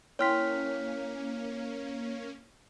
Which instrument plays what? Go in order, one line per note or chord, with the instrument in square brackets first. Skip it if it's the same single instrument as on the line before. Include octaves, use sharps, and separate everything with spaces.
[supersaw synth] A#3 C#4 [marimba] E4 G5 C6 [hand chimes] C#5 F6 B6